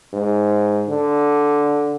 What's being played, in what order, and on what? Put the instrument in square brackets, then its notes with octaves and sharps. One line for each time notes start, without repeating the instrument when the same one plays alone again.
[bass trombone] G#2
D3